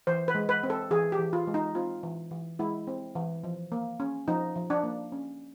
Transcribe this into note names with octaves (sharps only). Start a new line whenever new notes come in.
E3 C5
B4
G#3
B4
C4
A4
E3 G#4
G4
E3
F4
G#3
D#4
C4 F4
E3
E3
G#3 E4
C4
E3
F3
A#3
C#4
F3 D#4
F3
D4
A#3
C#4